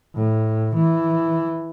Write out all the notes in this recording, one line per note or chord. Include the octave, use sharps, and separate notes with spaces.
A2
E3